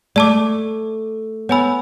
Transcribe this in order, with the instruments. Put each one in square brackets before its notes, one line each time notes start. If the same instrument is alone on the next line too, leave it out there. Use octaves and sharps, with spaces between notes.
[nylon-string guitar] A3 [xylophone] D5 A5 D6
[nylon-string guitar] B3 [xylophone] C#5 G#5 B5 E6